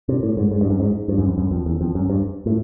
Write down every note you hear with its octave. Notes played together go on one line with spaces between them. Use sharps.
C3
A2
G#2
G#2
G2
F#2
G#2
G2
F#2
F2
F#2
F2
E2
F2
F#2
G2
A2